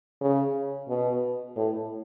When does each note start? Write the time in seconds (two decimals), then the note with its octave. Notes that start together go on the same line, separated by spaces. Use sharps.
0.21 C#3
0.89 B2
1.56 A2